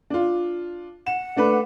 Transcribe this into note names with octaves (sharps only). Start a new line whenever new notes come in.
D4 F4
F#5 E7
A3 D4 B4